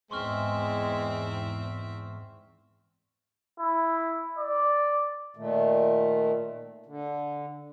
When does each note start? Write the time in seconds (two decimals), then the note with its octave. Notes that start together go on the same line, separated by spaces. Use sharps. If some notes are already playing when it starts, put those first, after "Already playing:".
0.11 E2 G#2 G#3 C4 E5 C6 C#6 F6
3.59 E4
4.39 D5
5.37 A#2 D#3 A3
6.86 D3